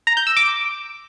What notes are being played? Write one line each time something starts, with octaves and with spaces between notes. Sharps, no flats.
A#5
G6
E6
D6